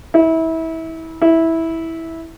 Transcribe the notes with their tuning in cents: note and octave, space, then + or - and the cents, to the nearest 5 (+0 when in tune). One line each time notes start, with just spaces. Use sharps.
E4 -25
E4 -10